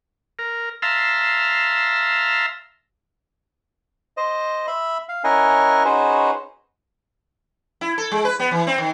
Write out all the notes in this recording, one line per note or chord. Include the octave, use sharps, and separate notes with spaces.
A#4
E5 F5 A5 A#5 C6 E6
C5 D#5
E5 B5
F5
C#4 E4 A#4 D#5 F#5 G#5
C#4 D#4 F#4 G#4 B4 C5
E4
A4
G#3
B4
B3
E3
C4
D#3